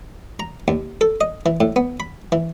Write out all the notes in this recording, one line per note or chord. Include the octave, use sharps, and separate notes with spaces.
A#5
D#2
A4
D#5
E3
A2
B3
B5
E3